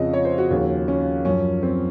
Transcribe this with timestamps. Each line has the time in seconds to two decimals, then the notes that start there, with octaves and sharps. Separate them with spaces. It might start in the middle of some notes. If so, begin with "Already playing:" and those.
Already playing: F2 C#3 F3 D#5
0.13 C#5
0.25 C5
0.38 F#4
0.51 D#2 C#3 F3
0.88 C#4
1.25 F#2 F3 C#4
1.63 C4